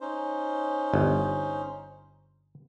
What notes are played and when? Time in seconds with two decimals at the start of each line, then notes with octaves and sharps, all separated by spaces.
0.01 C#4 D#4 C5
0.94 G1